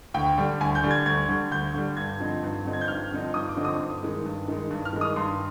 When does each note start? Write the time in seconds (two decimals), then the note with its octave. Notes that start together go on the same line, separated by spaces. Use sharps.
0.14 D2 G5
0.38 D3 G3
0.60 D2 G#5
0.75 G6
0.83 D3 G3
0.91 G#6
1.06 D2 G#6
1.29 D3 G3
1.51 D2 G6
1.74 D3 G3
1.97 G2 G#6
2.20 D3 F3 C4 D#4
2.43 G2
2.65 D3 F3 C4 D#4
2.73 G#6
2.81 G6
2.88 G2 F6
3.11 D3 F3 C4 D#4
3.34 G2 D#6
3.49 D6
3.56 D3 F3 C4 D#4
3.65 D#6
3.79 G2
4.03 D#3 G#3
4.25 G2
4.48 D#3 G#3
4.70 G2
4.85 F6
4.93 D#3 G#3
5.01 D#6
5.16 G2 C6